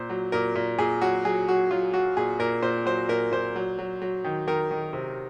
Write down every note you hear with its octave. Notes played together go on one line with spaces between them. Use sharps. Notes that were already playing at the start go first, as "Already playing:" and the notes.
Already playing: A#2 C5
F#3
A#2 A#4
A#2
A#2 G#4
F#3 F#4
F#3 G#4
F#3 F#4
F#3 F4
F#3 F#4
A#2 G#4
A#2 A#4
A#2 C5
F#3 C5
A#2 A#4
A#2 C5
F#3
F#3
F#3
D#3
D#3 A#4
D#3
C3